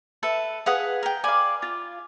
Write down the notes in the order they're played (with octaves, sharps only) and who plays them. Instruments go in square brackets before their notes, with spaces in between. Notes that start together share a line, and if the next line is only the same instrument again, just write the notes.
[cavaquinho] A4 B4 E5
[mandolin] G#4 B4 [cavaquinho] F5 F#5 D#6
[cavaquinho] A#4 G5
[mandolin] D5 F5 [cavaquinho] G#5 B5
[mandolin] F4